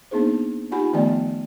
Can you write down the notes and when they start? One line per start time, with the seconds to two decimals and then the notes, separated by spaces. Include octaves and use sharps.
0.11 A#3 B3 D4 D#4 G#4 C5
0.71 D#4 F4 G4 F#5 G#5 B5
0.93 D#3 F3 A3 B3 D5 G5